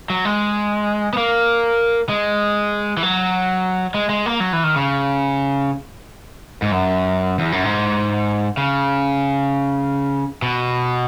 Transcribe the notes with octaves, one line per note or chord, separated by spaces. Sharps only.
F#3
G#3
B3
A#3
G#3
E3
F#3
G#3
G#3
A#3
F#3
E3
D#3
C#3
G#2
F#2
E2
F#2
G#2
C#3
B2